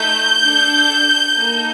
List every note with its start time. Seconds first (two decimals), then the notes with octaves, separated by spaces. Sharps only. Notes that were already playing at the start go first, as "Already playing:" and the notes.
Already playing: A3 D#4 A4 G6
0.43 D4 A4
1.35 A#3 D#4 A4